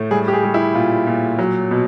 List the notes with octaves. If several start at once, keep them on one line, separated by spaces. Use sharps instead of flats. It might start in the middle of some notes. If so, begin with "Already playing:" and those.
Already playing: A2 A3
G3 G#4
G4
G#4
G3
E4
A#2 F4
A#2
F#3
B2